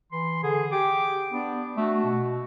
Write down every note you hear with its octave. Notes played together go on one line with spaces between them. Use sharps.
E3 C6
D3 G#4
G4 D6
B3 D4
A3 F#4
B2